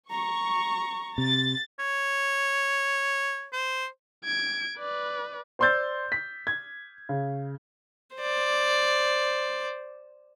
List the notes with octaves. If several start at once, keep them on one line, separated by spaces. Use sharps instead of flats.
A#5 C#6
C3 A6
C#5
C5
G#6 D7
B4 D5
C5 D5 C6 E6 G6 A6
B6
G#6
C#3
C5 D5